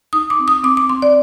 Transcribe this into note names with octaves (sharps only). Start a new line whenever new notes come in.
D#4 D#6
D6
C4
D#6
C4 D6
D6
C4 C6
D5